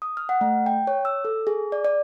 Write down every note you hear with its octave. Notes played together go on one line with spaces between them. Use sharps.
D#6
F6
F#5
A3
G5
C#5
E6
A4
G#4
D5
D5